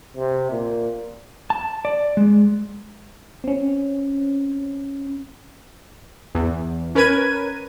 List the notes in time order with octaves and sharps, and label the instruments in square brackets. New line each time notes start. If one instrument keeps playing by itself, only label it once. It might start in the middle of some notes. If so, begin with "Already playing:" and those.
[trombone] C3
A#2
[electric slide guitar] A5
D5
G#3
[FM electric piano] C4 C#4
[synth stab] E2
C#4 A#4 B4 G#6 D#7